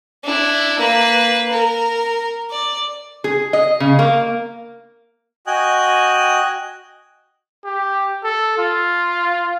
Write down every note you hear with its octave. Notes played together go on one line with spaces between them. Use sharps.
D4 E4
A#3 B4
A#4
D5
G#4
D#5
C#3
A#3
F#4 D#5 G5 G#5 D#6 F#6
G4
A4
F4